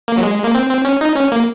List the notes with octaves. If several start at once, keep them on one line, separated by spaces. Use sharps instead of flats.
A#3
F#3
G#3
A#3
C4
C4
C#4
D#4
C#4
A#3